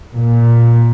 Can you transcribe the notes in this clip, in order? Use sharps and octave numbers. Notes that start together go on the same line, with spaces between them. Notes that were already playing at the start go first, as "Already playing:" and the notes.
A#2